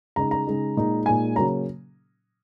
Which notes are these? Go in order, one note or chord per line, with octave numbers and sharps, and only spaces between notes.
C#3 G#3 D#4 A#5
A#5
C#3 G#3 D#4
A#2 G#3 D#4
A#2 G#3 D#4 G#5
C#3 F#3 A#3 C#4 A#5